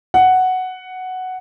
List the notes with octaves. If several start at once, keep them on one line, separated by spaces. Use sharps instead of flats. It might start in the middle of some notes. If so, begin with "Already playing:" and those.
F#5